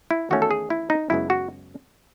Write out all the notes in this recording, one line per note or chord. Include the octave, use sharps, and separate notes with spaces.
E4
E2 D#3 A3 C#4 F#4
A4
G#4
E4
D#4
F#2 C#3 G#3 B3 E4
F#4